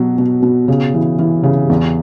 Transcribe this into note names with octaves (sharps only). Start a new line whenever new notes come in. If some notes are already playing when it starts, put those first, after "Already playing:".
Already playing: B2 F#3
B2
B2
C#3
E3
E3
C#3
E2